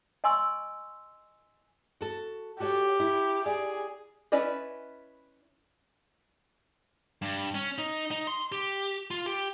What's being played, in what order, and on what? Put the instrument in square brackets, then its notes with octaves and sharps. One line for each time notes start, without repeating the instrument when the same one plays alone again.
[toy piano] D#5 G#5 C6 C#6 E6
[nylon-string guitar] F#4 A4
[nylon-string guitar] F#4 A4 C#5 [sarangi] G4
[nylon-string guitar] E4
[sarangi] G#4 [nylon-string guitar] D5
[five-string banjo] C#4 E4 B4 D5 D#5
[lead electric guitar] G2
C#4
D#4
D#4
C6
G4
F4
G4